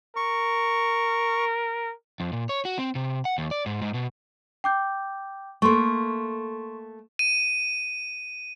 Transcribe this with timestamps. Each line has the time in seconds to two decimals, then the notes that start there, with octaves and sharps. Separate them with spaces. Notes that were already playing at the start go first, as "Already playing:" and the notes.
0.16 A#4 C#6
2.20 F2
2.33 A#2
2.49 C#5
2.65 F#4
2.79 C4
2.95 C3
3.25 F#5
3.38 D#2
3.51 D5
3.66 G#2
3.82 G#2
3.94 B2
4.64 G5 D6 G6
5.62 A3 A#3 C6 C#6
7.19 D#7